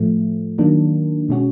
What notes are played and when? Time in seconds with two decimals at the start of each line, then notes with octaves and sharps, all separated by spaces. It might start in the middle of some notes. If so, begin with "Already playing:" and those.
Already playing: A2 F3 A3
0.58 D#3 F#3 A#3 D4
1.29 B2 G#3 C#4 F#4